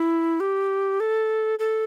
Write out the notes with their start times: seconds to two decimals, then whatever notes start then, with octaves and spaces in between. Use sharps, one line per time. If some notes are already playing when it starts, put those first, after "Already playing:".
Already playing: E4
0.40 G4
1.00 A4
1.59 A4